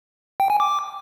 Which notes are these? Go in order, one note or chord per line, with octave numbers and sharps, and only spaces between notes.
G5
G#5
D6